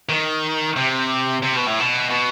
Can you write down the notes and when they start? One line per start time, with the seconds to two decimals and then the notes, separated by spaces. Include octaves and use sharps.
0.09 D#3
0.76 C3
1.43 C3
1.56 B2
1.66 A2
1.79 B2
2.10 B2